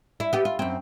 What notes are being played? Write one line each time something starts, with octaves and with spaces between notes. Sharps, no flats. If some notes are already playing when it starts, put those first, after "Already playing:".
E4
B3 G4
F4
F#2 C4